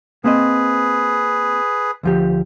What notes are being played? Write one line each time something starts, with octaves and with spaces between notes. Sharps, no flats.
A#3 C4 G#4 B4 D#5
D2 F3 G4